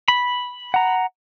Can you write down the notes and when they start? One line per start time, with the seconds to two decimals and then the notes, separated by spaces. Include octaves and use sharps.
0.08 B5
0.74 F#5 A#5